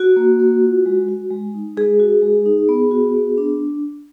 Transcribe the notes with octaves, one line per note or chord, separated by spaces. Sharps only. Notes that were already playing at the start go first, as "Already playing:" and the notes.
Already playing: F#4
A#3
A#3
F4
G#3
F#4
G#3
D#4
G#3 G#4
F#4
G#3
D#4
B3
F#4
B3
D4